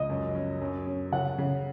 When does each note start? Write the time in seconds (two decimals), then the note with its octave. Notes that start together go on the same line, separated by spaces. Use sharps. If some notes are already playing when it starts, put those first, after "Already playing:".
Already playing: C#2 D#5
0.10 F#2
0.35 C#4
0.61 F#2
0.87 C#4
1.12 C#3 F#5
1.38 C#3